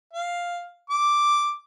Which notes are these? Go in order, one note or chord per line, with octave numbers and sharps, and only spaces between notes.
F5
D6